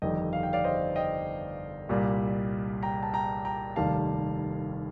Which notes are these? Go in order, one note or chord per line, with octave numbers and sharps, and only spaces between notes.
G1 F2 D#3 G3 D#5 G5
F5
G5
D5 F5
C5 D#5
D#5 G5
C2 A#2 G3
G5 A#5
A5
G5 A#5
G5 A#5
F1 D#2 D#3 G3 F5 A5